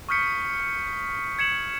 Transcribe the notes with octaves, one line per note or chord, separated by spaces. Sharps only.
C#6 D#6 F6 G6 B6 C#7
G#6 C#7 E7 F#7